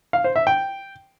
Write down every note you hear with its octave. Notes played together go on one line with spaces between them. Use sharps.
F5
C5
E5
G5